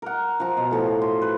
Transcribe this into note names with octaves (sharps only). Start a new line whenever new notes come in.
A#4 F#5
F3 A#5
B2
A2 F3
C6
B4